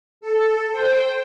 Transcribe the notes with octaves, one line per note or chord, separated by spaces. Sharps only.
A4
C5 G5